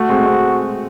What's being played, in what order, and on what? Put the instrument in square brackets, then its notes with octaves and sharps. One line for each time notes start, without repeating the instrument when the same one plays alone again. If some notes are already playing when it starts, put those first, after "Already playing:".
Already playing: [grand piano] A3 [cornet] F#4
[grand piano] G#3 C4
G#3 C4